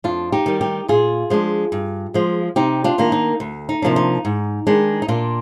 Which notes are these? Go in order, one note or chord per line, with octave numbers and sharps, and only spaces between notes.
F2 D4 F4
D#4 G4
D#3 G3
D#4 G4
A#2 F4 G#4
F3 G#3 D4
G2
F3 G#3
C3 D#4 G4
D4 F4
D#3 A#3 D4
D#4
D2
D#4
C3 F3 A#3 D4
D#4
G#2
D#3 G#3 D4
D#4
A#2 D4 F4